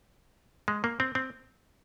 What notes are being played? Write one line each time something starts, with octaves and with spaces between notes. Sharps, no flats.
G#3
A#3
C4
C4